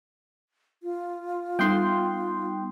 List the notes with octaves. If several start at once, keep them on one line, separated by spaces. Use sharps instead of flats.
F4
G3 B3 D#4 G5 C6 D#6 F#6